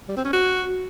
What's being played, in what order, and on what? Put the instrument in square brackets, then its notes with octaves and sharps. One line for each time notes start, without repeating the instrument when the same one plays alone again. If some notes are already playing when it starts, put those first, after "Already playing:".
[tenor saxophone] G3
C4
C#4
F#4